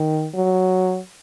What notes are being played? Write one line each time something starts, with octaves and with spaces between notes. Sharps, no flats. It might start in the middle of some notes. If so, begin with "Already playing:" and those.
Already playing: D#3
F#3